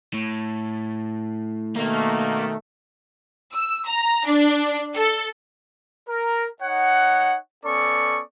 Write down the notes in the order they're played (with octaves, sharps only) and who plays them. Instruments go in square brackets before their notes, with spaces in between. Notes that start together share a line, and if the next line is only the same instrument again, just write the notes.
[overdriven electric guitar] A2
[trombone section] B2 D#3 A3 [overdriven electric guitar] A#3
[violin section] E6
A#5
D4
A4
[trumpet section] A#4
D#4 C#5 F#5
B3 C#4 A4 D5 C#6